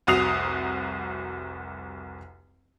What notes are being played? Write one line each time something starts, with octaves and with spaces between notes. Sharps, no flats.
F1 C2 F#4 D#6 C7 F7